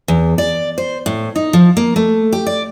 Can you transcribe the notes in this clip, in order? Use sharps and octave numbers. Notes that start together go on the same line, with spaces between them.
E2
D5
C5
A2
D#4
F3
A#3
A3
G4
D5